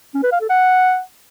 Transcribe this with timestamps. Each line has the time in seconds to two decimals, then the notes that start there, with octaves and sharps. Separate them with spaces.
0.15 C#4
0.23 B4
0.32 F5
0.41 A4
0.50 F#5